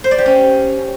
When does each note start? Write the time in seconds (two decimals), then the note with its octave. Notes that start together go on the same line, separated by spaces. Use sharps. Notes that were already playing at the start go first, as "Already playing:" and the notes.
0.04 C5
0.11 D5
0.18 G4
0.26 C#4